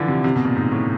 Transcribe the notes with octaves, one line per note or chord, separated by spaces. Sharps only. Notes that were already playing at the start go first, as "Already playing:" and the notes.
Already playing: D3 E3 F3
C3
C3
B2
A#2
G#2
A2